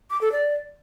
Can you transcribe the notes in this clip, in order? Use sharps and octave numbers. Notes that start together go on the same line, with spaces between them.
D6
A4
D5